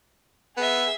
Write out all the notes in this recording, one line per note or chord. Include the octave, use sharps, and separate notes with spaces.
B3 G#4 E5